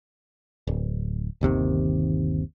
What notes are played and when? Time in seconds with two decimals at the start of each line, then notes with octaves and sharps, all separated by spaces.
0.67 D1
1.41 G1 D#2 C3 D#3